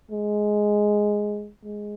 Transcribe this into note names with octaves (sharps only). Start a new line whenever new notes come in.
G#3
G#3